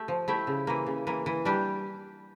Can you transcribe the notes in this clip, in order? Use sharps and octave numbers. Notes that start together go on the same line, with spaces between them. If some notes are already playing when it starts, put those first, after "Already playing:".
Already playing: A3 G4
F3
A3 E4 G4
C#3
E3 A#3
C#3
E3 A#3
E3
G3 D4 G4